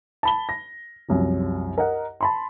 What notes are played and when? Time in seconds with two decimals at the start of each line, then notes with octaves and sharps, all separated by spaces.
0.23 A5 B5 G7
0.49 A#6
1.09 C2 F#2 C3 F3
1.78 A#4 D#5 F#5
2.21 A5 B5 C6